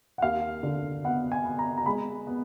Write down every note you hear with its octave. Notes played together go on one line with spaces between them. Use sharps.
F#5
D#2 F5
D3
B3 F#5
G#5
B3
A#5
A#5
G#3 B5
B3